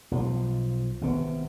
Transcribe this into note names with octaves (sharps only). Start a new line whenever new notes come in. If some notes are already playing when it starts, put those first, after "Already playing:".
B1 F3
G#1 C3 B3